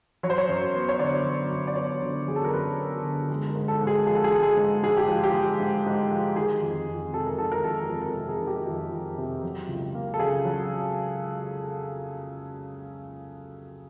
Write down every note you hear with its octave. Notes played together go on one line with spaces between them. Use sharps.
F#3 C#5
C5
C#5
F#2
B3
C#5
D3 D5
F#3
F#2
D5
B3 C#5
D3
F#3 G#4
A4
A#4
F#2 B4
B3
D3
G#3
A#4
G#2
A4
G#2
G#4
F3 G#4
A4
G#4
G#3 A4
G#4
G#2
G#2 G#4
G4
F3
G4
G#3
G#2
G#2
F3
D#3 G#4
F2
F2
C3 A4
A#4
D#3 A4
A#4
F2 A4
F2 A#4
A#4
A4
C3
G#4
D#3
G4
F2
F2
C3
F#3
C#2
A#3
A4
C#3 G#4
F#3